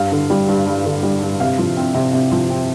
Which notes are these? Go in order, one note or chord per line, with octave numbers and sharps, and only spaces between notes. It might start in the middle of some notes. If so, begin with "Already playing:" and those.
Already playing: G2 F5
D3
G3
G2
G2
D3
G3
G2
C3 F5
F3
C4
C3
C3
F3
C4